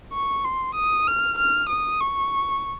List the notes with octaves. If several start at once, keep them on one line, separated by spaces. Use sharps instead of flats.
C#6
C6
D#6
F6
F6
D#6
C#6